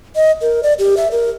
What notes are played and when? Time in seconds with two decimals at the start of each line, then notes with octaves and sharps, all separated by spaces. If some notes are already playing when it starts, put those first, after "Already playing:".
0.16 D#5
0.42 A#4
0.63 D5
0.79 G4
0.97 E5
1.11 A#4